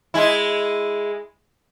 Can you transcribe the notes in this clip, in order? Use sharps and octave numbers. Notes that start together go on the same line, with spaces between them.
G#3 E4